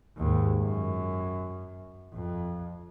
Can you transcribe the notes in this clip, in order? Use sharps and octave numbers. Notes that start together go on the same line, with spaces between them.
D#2 G#2
F#2
F2